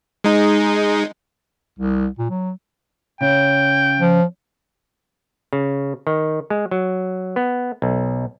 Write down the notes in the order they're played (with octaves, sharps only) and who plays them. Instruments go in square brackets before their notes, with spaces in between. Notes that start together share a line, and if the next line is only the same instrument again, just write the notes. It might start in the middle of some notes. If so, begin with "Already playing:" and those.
[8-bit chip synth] G#3 D#4
[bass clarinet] C2
A#2
F#3
[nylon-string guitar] C#3 [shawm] G5
[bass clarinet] F3
[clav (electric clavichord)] C#3
D#3
G#3
F#3
B3
B1